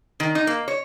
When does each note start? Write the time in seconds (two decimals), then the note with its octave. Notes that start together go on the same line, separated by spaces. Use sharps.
0.20 D#3
0.35 D#4
0.47 A#3
0.68 C#5